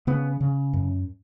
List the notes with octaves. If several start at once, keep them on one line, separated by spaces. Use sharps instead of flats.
C#3 B3
C#3
F#2